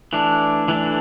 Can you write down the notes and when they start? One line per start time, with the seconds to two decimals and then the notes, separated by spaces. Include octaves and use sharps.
0.13 E3 A3 D4
0.68 E3 A3 D4